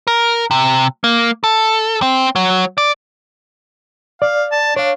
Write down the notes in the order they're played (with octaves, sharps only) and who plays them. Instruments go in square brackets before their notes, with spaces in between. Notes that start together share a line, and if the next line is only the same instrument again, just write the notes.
[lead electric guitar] A#4
C3
A#3
A4
C4
F#3
D5
[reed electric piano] D5 [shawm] F5
[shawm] A5
[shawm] D4 [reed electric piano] C#5 F5